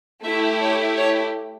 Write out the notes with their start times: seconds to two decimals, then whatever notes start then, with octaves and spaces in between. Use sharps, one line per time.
0.25 A3 E4 G4 E5
0.61 C#5
0.96 C#5